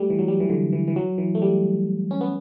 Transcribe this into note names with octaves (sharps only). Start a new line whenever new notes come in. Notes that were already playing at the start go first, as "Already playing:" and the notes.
Already playing: G3 A3
E3
F#3
G3
E3
D3
E3
E3
F#3
E3
A3
G3
C#4
B3